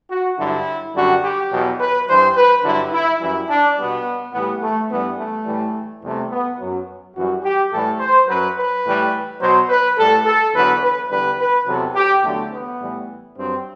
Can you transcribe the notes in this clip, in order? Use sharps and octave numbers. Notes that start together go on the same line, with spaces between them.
F#4
G2 D3 F#3 E4
F#2 D3 G3 F#4
G4
E2 B2 F#3
B4
G2 E3 G3 C5
B4
G2 D3 F#3 E4
E4
F#2 E3 G3 E4
D4
B2 G3 B3
A2 E3 G3 B3
A3
G2 E3 G3 B3
A3
A2 E3 G3
E2 C3 G3 A3
B3
F#2 F#3
F#2 E3 G3 F#4
G4
A2 E3 G3 A4
C5
F#2 F#3 B4
B4
A2 E3 G3
B2 F#3 C5
B4
A2 G3 A4
A4
E2 D3 F#3 B4
B4
E2 D3 G3 B4
B4
E2 C3 F#3 A4
G4
E2 D3 F#3 A3
B3
A2 E3 G3
G2 F#3 C4